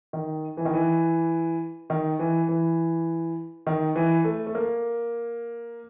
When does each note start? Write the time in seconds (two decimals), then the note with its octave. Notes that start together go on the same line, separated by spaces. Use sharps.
0.13 D#3
0.57 E3
0.65 D#3
0.73 E3
1.90 D#3
2.19 E3
2.48 E3
3.67 D#3
3.96 E3
4.24 A3
4.47 A3
4.55 A#3